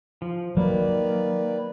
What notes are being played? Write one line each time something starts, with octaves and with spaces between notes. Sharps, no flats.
F3
D#3 F#3 A#3 B4 D5